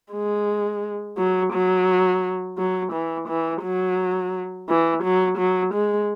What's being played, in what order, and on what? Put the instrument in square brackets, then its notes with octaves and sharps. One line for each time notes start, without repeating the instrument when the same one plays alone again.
[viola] G#3
F#3
F#3
F#3
E3
E3
F#3
E3
F#3
F#3
G#3